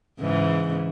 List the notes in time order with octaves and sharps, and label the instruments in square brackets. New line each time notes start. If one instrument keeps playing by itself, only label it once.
[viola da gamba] G#2 C#3 E3